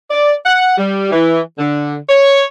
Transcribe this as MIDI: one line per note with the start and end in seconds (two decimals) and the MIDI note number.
0.11 0.33 74
0.46 0.73 78
0.78 1.10 55
1.11 1.40 52
1.59 1.95 50
2.09 2.43 73